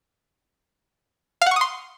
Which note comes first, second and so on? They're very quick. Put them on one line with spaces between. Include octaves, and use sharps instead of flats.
F5 F#5 C#6 D#6 C6